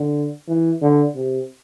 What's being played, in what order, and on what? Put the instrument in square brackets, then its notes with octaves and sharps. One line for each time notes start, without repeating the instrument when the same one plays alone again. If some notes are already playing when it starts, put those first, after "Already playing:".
Already playing: [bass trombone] D3
E3
D3
C3